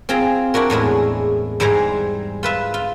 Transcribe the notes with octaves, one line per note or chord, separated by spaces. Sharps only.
C4 F4 G#4 A#5
D4 E4 F#4 A#4
E2 A2 G#3 E4
G#2 G3 G#3 E4 C5 A#5
F4 B4 E5
F4